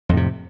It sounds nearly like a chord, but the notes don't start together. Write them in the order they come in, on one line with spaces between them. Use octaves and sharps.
F2 A2 C3